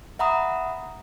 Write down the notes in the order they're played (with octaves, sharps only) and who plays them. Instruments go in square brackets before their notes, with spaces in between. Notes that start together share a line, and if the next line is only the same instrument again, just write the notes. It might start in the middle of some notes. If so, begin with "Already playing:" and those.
[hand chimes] E5 F#5 A#5 B5 D#6